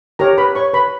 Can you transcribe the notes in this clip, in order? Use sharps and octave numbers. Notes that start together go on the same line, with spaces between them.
G4 A#4 C#5 A#5
B4 B5
C#5 C#6
B4 B5